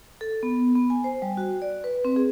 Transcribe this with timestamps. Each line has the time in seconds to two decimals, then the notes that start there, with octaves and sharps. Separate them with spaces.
0.21 A4
0.43 B3
0.76 B3
0.90 G#5
1.04 C5
1.22 G3
1.37 F#4
1.62 D5
1.84 B4
2.05 C4
2.16 G#4